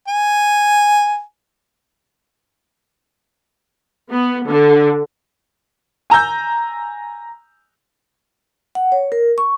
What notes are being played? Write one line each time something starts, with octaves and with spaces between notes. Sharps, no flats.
G#5
B3
D3
G#5 A#5 E6 G6
F#5
C#5
A#4
C#6